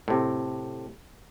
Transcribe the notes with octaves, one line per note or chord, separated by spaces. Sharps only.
A2 C3